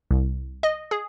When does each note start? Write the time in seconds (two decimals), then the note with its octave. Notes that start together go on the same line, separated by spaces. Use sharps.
0.11 C2
0.63 D#5
0.91 G#4